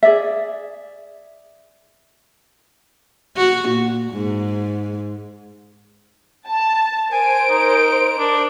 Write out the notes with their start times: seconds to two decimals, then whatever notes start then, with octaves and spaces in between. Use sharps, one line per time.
0.03 G#4 D5 E5
3.37 F#4
3.68 A#2
4.12 G#2
6.46 A5
7.12 A#4 C5 G#5 D7
7.50 D#4
8.18 D4